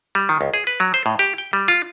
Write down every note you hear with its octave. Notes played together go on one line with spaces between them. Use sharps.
G3
D#3
C#2
G#4
B4
F#3
C5
A2
G4
G5
G3
F4